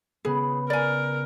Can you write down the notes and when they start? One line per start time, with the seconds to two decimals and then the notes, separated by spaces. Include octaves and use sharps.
0.25 C#3 B3 G#4
0.70 A#4 D5 G#5